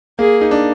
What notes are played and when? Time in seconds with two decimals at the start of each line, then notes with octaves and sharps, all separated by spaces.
0.19 A#3 G#4
0.41 D#4
0.51 D4